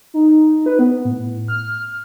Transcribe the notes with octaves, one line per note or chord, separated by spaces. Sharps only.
D#4
B4
B3
A2
F6